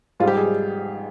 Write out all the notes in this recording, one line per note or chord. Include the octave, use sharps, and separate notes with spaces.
G#2 G3 F4 G4
G#4